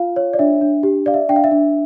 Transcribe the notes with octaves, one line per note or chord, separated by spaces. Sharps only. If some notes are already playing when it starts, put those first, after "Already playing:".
Already playing: F4 F5
C#5
D5
D4 E5
D4
G4
D5 F5
E5
D4 G5
F5
E5
D4